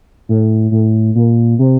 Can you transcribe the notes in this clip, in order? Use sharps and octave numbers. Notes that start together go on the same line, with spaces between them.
A2
A2
A#2
C3